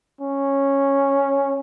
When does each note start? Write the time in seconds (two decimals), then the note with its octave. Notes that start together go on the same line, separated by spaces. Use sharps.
0.21 C#4